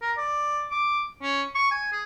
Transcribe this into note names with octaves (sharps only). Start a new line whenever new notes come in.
A#4
D5
D6
C#4
C#6
G#5
G#4